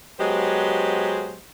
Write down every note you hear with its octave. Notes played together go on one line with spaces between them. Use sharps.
F#3 G#3 B3 G4 C5 D#5